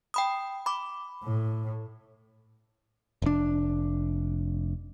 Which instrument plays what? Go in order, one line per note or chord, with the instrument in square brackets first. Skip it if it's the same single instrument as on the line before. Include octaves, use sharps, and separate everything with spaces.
[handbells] G5 B5 D#6
B5 D6
[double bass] A2
[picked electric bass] F1 D4